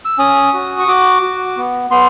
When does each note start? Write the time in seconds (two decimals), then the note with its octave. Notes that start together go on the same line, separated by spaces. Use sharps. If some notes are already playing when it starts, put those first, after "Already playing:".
0.05 E6
0.19 C#4 D#6
0.54 F#4
0.80 C#6
0.88 F#4 D6
1.23 F#4
1.57 B3
1.90 B3 C6